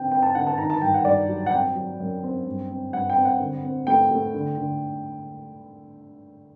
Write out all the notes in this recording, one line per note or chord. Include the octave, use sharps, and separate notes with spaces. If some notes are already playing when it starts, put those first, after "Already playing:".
Already playing: D3 C4 G5
C4 G5
A5
D3 F#5
A5
D#3 A#5
A5
G2 G5
F#5
G2 D5
F#3
F#5
C4 G5
F#3
F#2
C4
G2
C4
G2 F#5
G5
C4
F#5
D3
C4
A3 G5
A3
D3
D3